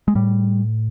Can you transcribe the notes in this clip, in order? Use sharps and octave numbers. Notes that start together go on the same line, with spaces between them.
G#3
A2 G3